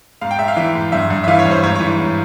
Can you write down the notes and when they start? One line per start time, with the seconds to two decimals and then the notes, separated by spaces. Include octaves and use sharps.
0.21 G#2 F5
0.31 G5
0.39 G#2 E5
0.48 F5
0.57 E3 E5
0.75 G#2
0.92 G2 E5
1.10 G2
1.24 E5
1.28 E3 F5
1.39 C#5
1.46 G2
1.51 C5
1.63 G#2 C#5
1.76 C#5
1.80 E3
1.87 C#5
1.99 G#2